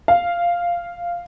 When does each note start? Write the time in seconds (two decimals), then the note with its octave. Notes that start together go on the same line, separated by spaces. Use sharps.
0.08 F5